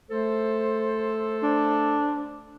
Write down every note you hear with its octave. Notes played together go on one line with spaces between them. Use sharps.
A3 A4 C5
D4